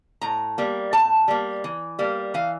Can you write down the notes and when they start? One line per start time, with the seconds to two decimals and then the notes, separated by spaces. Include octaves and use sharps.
0.21 A2 A#5
0.58 G3 A#3
0.93 A2 A5
1.28 G3 A#3
1.64 E3
1.99 G3 A#3
2.34 E3 F5